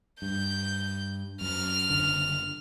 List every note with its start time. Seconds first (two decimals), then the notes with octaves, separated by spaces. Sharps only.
0.22 G2 G6
1.41 F#2 F6
1.90 F#1 D3